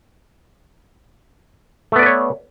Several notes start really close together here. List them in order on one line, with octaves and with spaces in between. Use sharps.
A3 B3 D5 B4 C#5